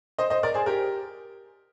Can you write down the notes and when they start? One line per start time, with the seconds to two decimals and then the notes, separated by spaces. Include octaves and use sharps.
0.18 C5 D#5
0.30 C5 D#5
0.43 A#4 D5
0.54 G#4 C5
0.66 G4 A#4